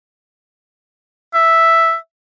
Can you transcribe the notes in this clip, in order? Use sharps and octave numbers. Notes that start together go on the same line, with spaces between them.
E5